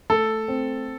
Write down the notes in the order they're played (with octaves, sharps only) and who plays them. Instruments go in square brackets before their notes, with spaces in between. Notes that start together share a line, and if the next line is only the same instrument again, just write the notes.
[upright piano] A3 [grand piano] A4
[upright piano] C4